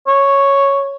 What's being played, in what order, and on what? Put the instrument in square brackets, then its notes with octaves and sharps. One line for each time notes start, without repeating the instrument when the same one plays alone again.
[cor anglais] C#5